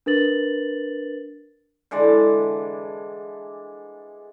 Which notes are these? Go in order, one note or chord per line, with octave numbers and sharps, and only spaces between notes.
D4 A#4 B4 A6 F#7
D3 E3 G#3 D5